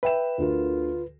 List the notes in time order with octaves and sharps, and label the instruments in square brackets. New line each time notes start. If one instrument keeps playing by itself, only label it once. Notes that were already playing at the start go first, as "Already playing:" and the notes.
[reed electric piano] B4 [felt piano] E5 G5 E7
[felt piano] D2 D3 A#4 [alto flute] F4